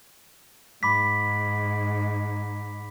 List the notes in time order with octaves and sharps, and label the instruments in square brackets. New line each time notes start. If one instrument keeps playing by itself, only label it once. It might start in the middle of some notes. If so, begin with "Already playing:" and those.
[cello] G#2 [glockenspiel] B5 D6 B6